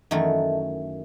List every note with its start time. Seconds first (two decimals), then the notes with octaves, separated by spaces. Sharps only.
0.11 F#2 D#3 E3 A3